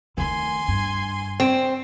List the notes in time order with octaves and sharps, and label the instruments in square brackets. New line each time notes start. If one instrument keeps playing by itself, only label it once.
[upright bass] D#3 A3 [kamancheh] G#5 C6
[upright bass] G2
[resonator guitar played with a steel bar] C4